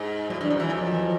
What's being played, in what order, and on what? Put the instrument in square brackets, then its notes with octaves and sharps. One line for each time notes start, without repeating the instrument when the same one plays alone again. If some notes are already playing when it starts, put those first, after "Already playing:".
Already playing: [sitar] G#2
[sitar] A2 [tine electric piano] F#3
[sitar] G2 [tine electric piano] E3
[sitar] F#2
[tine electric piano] F#3
[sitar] E3
[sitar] F2 [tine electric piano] F#3
[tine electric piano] F3
E3
F3